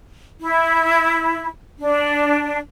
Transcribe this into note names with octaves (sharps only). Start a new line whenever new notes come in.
E4
D4